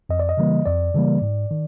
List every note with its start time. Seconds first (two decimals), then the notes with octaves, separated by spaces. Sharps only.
0.09 F2 D#5
0.19 D5
0.29 D#5
0.37 C#3 E3 G3 A#3
0.66 F2 D5
0.95 C#3 E3 G3 A#3
1.22 G#2
1.51 D#3